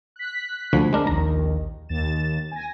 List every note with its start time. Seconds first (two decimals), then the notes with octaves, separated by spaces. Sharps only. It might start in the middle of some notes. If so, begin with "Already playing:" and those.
0.16 F#6 B6
0.73 D2 D3 F3
0.93 G#3 D4 A#4
1.07 A#1 D#2 D#3 A#5
1.89 D#2 A6 E7
2.51 G#5 A#6